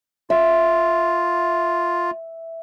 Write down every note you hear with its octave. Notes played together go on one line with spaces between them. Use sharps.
F4 E5